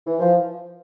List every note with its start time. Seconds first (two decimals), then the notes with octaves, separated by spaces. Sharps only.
0.06 E3
0.20 F3